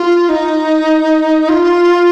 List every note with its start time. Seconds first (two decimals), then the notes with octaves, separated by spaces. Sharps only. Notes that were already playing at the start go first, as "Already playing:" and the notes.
Already playing: F4
0.29 D#4
1.49 F4